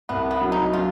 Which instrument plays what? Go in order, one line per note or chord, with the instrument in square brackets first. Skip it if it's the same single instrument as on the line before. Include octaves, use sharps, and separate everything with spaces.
[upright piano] C2 [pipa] B3
[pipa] B3
[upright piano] F#3
[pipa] D#4
[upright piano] F#3 [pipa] F4